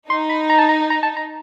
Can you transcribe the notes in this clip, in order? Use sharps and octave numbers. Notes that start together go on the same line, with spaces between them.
D#4 C6
B5
A#5
A5
A#5
A#5
A5
A#5